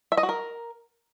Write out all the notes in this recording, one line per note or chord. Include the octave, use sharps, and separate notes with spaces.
E5
D#5
F#4
A#4